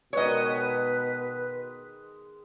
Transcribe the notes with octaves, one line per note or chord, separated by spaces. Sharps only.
B2 D#3 G#3 B4 C#5 D#5